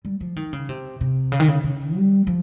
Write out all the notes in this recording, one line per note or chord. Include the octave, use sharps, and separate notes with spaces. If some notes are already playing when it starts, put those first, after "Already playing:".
G3
F3
D#3
C#3
C3
C3
C#3
D#3
C#3
C#3
G3
F3